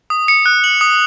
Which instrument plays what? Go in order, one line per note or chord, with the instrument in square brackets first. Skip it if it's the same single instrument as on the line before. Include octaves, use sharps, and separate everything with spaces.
[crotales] D#6
C#7
F#6
F#7
D#6